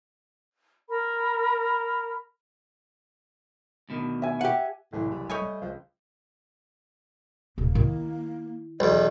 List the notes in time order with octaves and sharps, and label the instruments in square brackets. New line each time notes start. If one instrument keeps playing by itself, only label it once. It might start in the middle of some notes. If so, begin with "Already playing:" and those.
[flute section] A#4 B5
[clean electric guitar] D2 B2 D#3
[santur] E5 G#5
[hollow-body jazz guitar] G4 F#5
[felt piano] F#1 C2 E3 [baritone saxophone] A2
[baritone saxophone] G3
[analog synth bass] G3 [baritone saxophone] A3 [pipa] C#5 D#5 G#5 [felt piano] B5 G6
[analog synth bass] G3
[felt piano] C#2 [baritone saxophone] F3
[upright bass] D#1 [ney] A#3
[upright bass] D#3 E4
[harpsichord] B1 E2 [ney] D#5